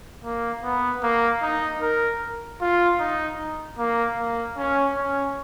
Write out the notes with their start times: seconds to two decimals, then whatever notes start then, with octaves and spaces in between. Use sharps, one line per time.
0.24 A#3
0.64 B3
1.03 A#3
1.42 D#4
1.82 A#4
2.61 F4
3.00 D#4
3.79 A#3
4.18 A#3
4.57 C#4
4.96 C#4